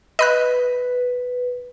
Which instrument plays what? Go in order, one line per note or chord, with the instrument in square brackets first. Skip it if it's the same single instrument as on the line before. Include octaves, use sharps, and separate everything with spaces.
[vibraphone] B4 [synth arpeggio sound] D#5 B5 F#6